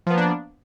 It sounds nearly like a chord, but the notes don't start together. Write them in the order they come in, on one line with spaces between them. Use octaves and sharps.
F3 B3 A#3 D4